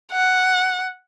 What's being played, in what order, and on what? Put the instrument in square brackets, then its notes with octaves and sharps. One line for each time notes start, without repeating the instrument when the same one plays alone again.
[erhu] F#5